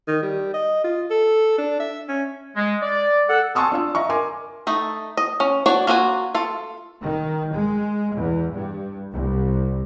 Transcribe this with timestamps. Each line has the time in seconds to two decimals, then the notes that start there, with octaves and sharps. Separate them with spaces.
0.08 D#3
0.22 G3
0.54 D#5
0.84 F4
1.11 A4
1.58 D4
1.80 E5
2.09 C#4
2.57 G#3
2.82 D5
3.29 A4 F#5
3.55 G#5 A5 C6 C#6 D#6 E6
3.72 D4 F4 E6
3.95 D#5 E5 A#5 C#6
4.09 A#4 G#5 C6 D6
4.67 A3 D#4
5.17 D#5
5.40 C#4
5.66 D4 F#4 C#5 D5
5.87 A#3 F4 F#4 G#5
6.35 F4 A4
7.03 D#3
7.54 G#3
8.16 E2
8.54 G2
9.12 C2